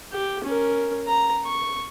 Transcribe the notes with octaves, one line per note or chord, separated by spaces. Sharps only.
G4
C#4 A#4
A#5
C#6